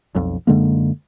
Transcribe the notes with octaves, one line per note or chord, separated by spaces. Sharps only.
B1 F2
F#2 D3 G#3 A#3